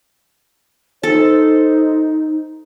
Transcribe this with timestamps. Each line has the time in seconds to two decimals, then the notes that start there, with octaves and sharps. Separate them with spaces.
1.03 D#4 A4 C5